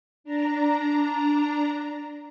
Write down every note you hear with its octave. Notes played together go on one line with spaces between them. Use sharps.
D4 A#5